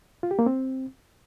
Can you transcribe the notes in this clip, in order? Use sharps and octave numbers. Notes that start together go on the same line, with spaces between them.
F4
G4
A#3
C4